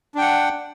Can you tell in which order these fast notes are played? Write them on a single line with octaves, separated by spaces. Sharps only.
D4 G5 F#5